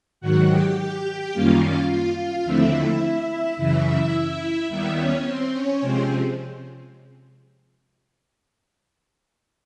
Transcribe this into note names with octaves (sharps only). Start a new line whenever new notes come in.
G#2 D#3 F#3 F#4 F#5
G4 G5
G4 G5
F#2 D#3 G3 A#3 C#4 F4 F5
F4 F5
F4 F5
F4 F5
D#2 D3 F3 A3 C4 E4 E5
F#2 C#3 E3 E4 E5
D#2 D#3 G3 B3 E4 E5
C#4 C#5
C4 C5
C#4 C#5
C3 F3 G#3 C4 C5